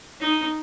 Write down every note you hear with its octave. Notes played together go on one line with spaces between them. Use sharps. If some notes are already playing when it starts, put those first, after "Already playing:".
D#4